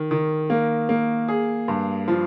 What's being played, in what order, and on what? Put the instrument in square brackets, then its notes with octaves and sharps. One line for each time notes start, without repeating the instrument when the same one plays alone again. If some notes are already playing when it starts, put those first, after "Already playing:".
Already playing: [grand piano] D#3
D#3
A#3
A#3
G#4
G2
F3